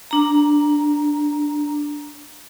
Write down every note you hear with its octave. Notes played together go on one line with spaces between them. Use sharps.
D4 A#5